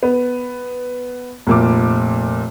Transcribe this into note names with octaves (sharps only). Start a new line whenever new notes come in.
B3
F1 A#2 D6